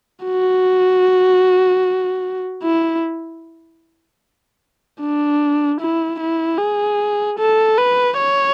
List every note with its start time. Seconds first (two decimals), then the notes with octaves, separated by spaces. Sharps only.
0.24 F#4
2.63 E4
5.00 D4
5.80 E4
6.20 E4
6.59 G#4
7.39 A4
7.78 B4
8.18 C#5